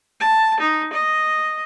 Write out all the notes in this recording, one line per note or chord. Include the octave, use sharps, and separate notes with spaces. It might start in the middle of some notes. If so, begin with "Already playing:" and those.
A5
D#4
D#5